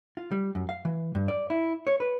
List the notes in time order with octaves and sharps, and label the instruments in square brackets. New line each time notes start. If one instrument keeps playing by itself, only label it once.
[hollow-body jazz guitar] F4
G3
F#2
F5
E3
G2
D5
E4
C#5
B4